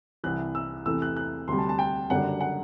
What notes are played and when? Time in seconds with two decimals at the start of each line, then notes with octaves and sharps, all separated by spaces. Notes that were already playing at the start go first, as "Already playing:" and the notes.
0.24 C2 C3 E3 F#6
0.55 E6
0.86 E2 C3 E3 A3 E6
1.02 F#6
1.17 F#6
1.48 D2 C3 G3 C6
1.58 A5
1.69 A5
1.79 G5
2.10 F#1 F#2 D3 G3 D4 F#5
2.41 F#5